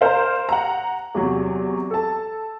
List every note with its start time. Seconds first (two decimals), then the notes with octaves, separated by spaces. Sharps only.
0.01 A#4 C5 F5
0.49 F#5 A#5
1.15 E2 C3 F#3
1.91 A4 A5